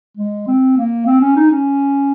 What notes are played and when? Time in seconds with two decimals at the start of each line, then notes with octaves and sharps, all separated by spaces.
0.17 G#3
0.47 C4
0.77 A#3
1.06 C4
1.21 C#4
1.36 D#4
1.51 C#4